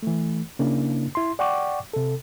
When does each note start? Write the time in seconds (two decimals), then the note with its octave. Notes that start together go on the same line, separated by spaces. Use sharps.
0.03 E3 A3
0.59 C#3 A#3 C#4 D4 E4
1.15 E4 C6
1.39 D5 F#5 G5 C#6 D6
1.94 C3 A4